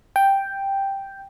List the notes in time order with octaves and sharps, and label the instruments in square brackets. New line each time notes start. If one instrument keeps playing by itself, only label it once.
[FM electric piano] G5